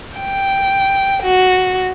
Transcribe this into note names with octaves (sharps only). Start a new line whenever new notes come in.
G5
F#4